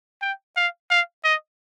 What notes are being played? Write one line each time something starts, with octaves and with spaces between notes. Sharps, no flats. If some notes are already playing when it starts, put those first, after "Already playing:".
G5
F5
F5
D#5